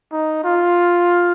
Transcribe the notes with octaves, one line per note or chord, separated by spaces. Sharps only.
D#4
F4